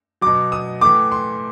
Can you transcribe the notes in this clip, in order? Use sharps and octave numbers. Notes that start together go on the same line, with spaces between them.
B2 F#3 D6
D#6
A2 E3 D6
C6